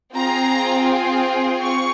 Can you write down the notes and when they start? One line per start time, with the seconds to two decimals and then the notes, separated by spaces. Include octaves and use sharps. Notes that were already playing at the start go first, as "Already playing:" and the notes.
0.13 C4 F4 G#4 A#5
1.60 C#6